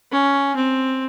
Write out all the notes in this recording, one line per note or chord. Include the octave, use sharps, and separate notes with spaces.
C#4
C4